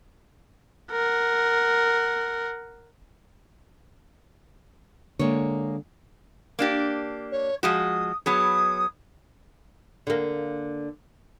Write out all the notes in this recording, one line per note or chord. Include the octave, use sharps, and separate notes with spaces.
A#4 F#5
D3 G#3 A#3 C#5
A#3 D4 G4
C#5
F3 G#3 F#4 D#6
F#3 B3 G#4 D#6
D3 A#3